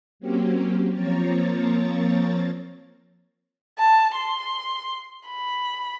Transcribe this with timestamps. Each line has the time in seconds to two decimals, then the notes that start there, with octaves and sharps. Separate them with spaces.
0.20 F#3 A#3 C4 C#4 G4
0.92 F3 A#3 C4 C#5 A#5 A6
3.79 A5
4.15 C6
5.27 B5